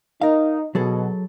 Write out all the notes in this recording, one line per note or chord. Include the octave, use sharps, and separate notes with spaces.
D#4 A#4 F5
B2 F#3 G#4 A4